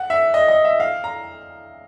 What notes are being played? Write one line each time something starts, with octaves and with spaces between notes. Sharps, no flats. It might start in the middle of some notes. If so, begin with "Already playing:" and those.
Already playing: F#5
E5
D#5
D#5
E5
F5
A#5